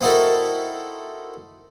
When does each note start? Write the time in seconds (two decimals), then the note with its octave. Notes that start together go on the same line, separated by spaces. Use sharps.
0.01 C4 D#4 E4 F#4 A4 A#4